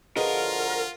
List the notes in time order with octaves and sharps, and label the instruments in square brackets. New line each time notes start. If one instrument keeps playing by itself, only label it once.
[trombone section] D3 F3 F#4 [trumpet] F4 [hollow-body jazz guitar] G#4 B4 D#5 [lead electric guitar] A#4